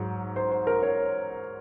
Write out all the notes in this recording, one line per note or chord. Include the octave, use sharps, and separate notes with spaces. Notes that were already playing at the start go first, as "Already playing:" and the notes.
Already playing: G#2 F#3
C5
C5
A#4
C#5